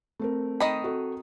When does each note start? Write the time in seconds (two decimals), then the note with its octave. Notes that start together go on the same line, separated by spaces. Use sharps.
0.19 A3 C4 A#4
0.60 D#3 D#5 B5
0.82 C4 F#4 A4